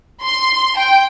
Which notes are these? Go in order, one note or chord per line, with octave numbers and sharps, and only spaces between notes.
C6
G5